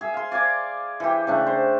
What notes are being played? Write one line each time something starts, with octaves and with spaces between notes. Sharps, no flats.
G#4 E5
F5 C6
D5 F5 G#5 D6
E3 G4
C#3 A3 D4
C5